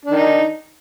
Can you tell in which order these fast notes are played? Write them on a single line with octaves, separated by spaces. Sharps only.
D4 D#3 D#4